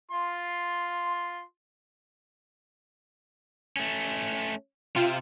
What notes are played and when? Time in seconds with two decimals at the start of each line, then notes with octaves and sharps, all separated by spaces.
0.11 F4 C6
3.77 A3 C#4
4.96 C3 C4 F4